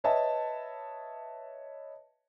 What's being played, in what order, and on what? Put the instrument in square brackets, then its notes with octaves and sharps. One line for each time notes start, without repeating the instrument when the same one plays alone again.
[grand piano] B4 C#5 D#5 E5 A5